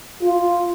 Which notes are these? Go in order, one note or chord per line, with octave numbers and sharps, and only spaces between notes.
F4